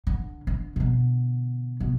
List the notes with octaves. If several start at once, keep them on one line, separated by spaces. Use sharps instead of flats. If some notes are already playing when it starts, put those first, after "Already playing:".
D3
D3
B2 D3
B2